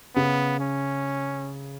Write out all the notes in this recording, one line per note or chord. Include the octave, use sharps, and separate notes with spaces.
C#3 B3
C#4